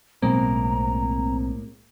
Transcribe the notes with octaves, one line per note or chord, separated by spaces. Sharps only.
B1 A2 G#3 A#3 C4 A#5